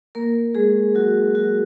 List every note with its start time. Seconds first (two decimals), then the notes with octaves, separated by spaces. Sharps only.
0.15 A#3 A#4
0.55 G#3 G#4
0.95 F#3 F#4
1.35 F#3 F#4